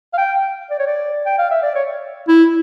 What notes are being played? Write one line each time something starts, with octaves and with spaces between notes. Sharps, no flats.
F5
G5
D5
C#5
D5
G5
F5
E5
D5
C#5
E4